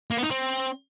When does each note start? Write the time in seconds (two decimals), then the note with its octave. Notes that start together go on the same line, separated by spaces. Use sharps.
0.11 A#3
0.17 B3
0.24 D#4
0.31 C4